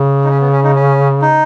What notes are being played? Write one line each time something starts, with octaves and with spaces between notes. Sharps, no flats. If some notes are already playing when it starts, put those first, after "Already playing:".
Already playing: C#3
D#4
C#4
B3
C#4
D#4
C#4
D#4